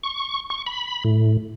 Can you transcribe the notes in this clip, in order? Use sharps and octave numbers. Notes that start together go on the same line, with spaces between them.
C#6
C#6
B5
A2